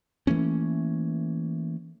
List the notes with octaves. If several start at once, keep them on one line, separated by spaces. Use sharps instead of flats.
E3 A3 A#3 C#4